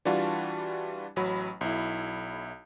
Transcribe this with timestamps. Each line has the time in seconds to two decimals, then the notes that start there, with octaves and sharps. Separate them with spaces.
0.05 E3 G3 D4 F4 F#4 A5
1.16 A1 F#3 B5
1.61 B1 E4